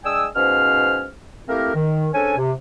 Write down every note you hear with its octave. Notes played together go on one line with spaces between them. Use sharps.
G#3 D4 G5 G#5 D#6 E6
G#2 B2 C#4 C5 F5 F6
A3 A#3 C4 E4 G4 A#4
D#3
G#2 C#4 D4 A4 G#5
C3